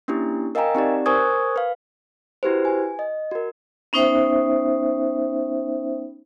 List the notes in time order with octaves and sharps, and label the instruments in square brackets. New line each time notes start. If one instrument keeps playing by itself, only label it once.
[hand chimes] A#3 C#4 D4 E4 G4
A#4 D#5 F5 G5 G#5 A#5
C4 D#4 G4 D5
A#4 C5 G#5 C#6 D#6 G#6
B4 F5
E4 F#4 G4 B4 C5
G#5
D#5
F#4 A#4
[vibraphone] B3 C#4 D#4 C5 E5 G5